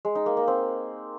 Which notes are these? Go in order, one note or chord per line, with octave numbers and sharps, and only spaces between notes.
G#3
D#4
A#3
A#3
C4